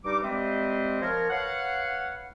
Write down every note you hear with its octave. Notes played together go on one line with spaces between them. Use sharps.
G2 G3 D#4 D6
G3 G#3 C4 C5 D#5 E5
F3 A#4 C#5
B4 C#5 F5 F#5